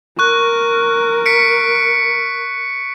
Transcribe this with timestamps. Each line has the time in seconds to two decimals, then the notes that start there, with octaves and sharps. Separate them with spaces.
0.19 A#4 C#6 F#6
1.26 B6 C#7 D7